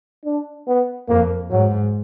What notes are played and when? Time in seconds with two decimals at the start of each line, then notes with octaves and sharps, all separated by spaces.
0.25 D4
0.67 B3
1.09 F2 A#3
1.50 G#2 F#3